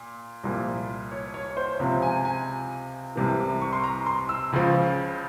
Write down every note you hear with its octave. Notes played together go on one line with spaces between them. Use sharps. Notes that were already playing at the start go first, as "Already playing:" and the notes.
Already playing: A#2
C2 A#2 F3
C#5
C#5
C5
C#2 C3 F3 E5
G#5
G#5
C2 C3 E3
C#6
C6
A#5
C6
E6
C#2 C#3 F3